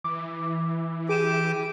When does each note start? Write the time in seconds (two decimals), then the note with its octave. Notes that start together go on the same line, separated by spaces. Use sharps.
0.04 E3 D6
1.09 G4 G#4 D6 D#7 E7